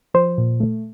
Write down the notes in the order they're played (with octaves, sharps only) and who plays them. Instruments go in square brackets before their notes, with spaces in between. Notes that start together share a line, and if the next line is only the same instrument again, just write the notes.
[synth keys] F3 [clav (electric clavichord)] C5
[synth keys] A#2
A3